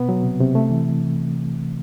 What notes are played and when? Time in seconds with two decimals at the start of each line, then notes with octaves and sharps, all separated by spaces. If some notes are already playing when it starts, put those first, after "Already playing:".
Already playing: B2 B3
0.09 F#3
0.23 C3
0.40 C3
0.55 A3
0.71 E3